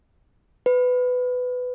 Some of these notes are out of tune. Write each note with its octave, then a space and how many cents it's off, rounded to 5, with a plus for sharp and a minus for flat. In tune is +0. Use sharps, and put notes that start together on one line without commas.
B4 +15